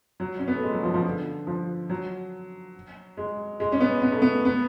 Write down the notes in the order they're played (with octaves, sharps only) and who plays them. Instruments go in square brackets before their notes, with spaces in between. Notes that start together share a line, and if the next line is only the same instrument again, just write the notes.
[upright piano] F#3
C#4
B3
A3
G#3
F#3
F3
F3
D3
F3
F#3
G#3
G#3
C#4
B3
B3
A3
B3
B3